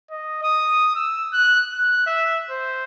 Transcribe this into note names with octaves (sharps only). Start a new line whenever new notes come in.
D#5
D#6
E6
F#6
F#6
E5
C5